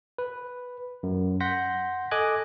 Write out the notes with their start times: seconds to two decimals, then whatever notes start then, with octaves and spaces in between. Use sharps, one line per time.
0.18 B4
1.03 F#2
1.40 F#5 C6 G6 A#6 B6
2.11 A4 D#5 G#5 D6 F#6 G#6